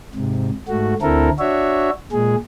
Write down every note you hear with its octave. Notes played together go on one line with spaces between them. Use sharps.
G#2 C3
G#2 A3 F#4
D2 D3 C4 E4 A4 A#4
D4 F#4 C#5 E5
A#2 G#3 G#4